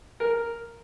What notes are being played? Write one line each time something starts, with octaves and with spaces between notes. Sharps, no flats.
A#4